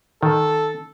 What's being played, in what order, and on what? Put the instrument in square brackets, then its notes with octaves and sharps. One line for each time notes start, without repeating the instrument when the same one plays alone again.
[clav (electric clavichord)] D#3 [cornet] A4